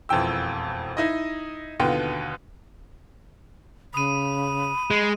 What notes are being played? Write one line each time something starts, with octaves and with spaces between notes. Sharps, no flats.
E1 F2 E3 G5 E6
D#4 E4 D#5
D#2 B2 D3 B3 F4 G5
C#3 B5 D#6 D#7
G#3